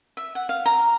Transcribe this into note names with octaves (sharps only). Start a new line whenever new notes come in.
E5
F#5
F5
A#5